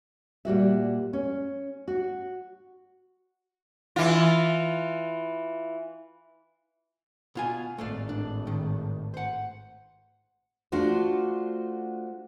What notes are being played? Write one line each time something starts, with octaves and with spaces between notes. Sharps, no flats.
A#2 G3 F#4 E5
C#4
F#4
E3 F4
B2 F4 G#5
G#1 A2 A3 D5 F5
D4
D#3
C5 F#5
A3 D4 F4 F#4 C5